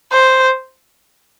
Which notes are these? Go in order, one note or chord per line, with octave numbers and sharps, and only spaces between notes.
C5